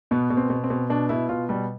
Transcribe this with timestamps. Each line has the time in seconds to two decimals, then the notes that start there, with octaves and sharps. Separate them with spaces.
0.11 B2 B3
0.30 B2
0.37 C4
0.50 B2
0.64 C4
0.70 B2
0.90 B2 D4
1.09 B2 E4
1.29 B2 F4
1.49 B2 G3